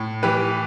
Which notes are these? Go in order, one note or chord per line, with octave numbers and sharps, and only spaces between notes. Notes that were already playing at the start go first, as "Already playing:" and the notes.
Already playing: A2
E3 G4 B4